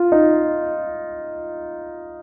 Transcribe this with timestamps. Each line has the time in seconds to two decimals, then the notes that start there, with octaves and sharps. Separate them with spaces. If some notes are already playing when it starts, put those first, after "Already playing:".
Already playing: F4
0.12 D#4